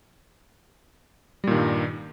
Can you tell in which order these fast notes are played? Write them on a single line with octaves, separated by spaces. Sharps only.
G3 A#2 D#3 G2